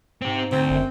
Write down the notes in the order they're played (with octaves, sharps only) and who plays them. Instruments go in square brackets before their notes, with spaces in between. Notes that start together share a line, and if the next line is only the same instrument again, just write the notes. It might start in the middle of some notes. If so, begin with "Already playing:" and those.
[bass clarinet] G#2 [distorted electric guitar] C4 G4
[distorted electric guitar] D2 [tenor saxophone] C4
[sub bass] G1 [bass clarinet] F#2